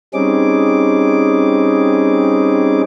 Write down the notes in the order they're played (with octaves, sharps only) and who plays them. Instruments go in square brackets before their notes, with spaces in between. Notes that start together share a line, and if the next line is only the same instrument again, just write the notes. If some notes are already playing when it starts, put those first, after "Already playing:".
[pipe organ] G3 C4 C#4 D#4 G#4 D6